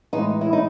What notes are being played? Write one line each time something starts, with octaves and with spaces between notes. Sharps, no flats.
A2 E3 G#3 D#4
E4
D#4